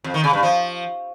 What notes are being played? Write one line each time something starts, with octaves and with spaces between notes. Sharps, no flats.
F2
D#3
C#3
G2
F3